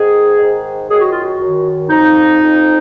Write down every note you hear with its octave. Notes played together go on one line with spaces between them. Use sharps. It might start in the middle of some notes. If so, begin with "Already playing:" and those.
Already playing: G#2 D#3 G#4
G#2 D#3
F#2 D#3 G#4
F#4
F4
F#4
F#2 D#3
F2 F3 D#4
F2 F3